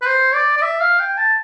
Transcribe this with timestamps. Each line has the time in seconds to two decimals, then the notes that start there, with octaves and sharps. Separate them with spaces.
0.02 B4
0.06 C5
0.35 D5
0.57 D5
0.62 E5
0.81 F5
1.00 G5
1.18 A5